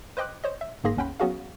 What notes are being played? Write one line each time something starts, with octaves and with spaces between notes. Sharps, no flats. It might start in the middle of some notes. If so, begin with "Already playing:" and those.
B4 C5 D#5 G5 D6 F#6
C5 C#5 D#5
E5
G1 G#2 A#3 G#4 C6 A#6
G1 D#2 C#4 F#5 G5 B5
F#3 B3 C#4 F#4 G#4 F5